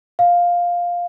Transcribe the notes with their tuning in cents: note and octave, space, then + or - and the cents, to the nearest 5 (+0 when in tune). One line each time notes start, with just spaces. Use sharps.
F5 +5